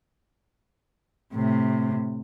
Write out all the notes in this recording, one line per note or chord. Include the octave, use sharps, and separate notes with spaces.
A2 C3